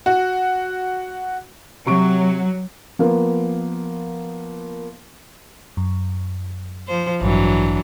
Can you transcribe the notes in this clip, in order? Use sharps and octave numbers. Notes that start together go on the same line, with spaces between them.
F#4
C3 F#3 C#6 D7
F3 A#3 B3
F#2
F3 C5
A1 G2 E3 F#3 D4